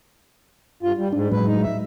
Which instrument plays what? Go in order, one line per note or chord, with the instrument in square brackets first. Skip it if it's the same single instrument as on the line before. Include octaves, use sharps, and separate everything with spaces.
[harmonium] G2 F4
G3
[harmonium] G#2 [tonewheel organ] D4
[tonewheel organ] A2 F#3 G#3 [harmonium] B4
[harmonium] D#4
E5